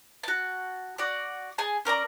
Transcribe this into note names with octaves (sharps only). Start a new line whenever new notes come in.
F#4 A5
F#4 D5
G#4 G#5 A5
C#4 A#4 D5 A#5